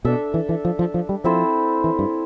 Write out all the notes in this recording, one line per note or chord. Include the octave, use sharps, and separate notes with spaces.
B2 D4 A4 E5
E3
E3
F3
F3
F3
G3
F3 C4 E4 A4 C5
E3
G2